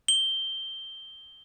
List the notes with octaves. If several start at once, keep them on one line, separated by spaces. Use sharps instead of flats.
G7